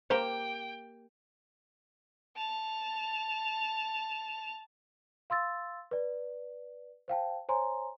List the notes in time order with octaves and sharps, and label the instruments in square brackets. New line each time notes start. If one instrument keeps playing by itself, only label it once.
[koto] A#3 G4 [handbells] C5 A#5 [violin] G5
[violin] A5 F7
[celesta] F5 C6 E6 A6
B4 D5
C5 F5 G5 A5
C5 C#5 G#5 A#5 C6